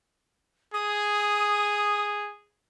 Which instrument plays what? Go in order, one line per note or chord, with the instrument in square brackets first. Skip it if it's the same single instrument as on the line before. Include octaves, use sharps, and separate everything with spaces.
[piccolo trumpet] G#4 [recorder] D#6